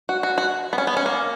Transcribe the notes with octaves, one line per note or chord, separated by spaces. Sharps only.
F#4
F#4
F#4
B3
C#4
B3
C#4
A#3